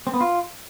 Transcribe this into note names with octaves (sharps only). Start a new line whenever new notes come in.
C4
B3
F4